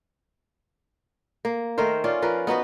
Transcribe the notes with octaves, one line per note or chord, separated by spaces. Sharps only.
A#3
D#3 A3 A#4 C5
C#4 F4 D5
F3 A#4 B4
B3 D#4 F#4 B4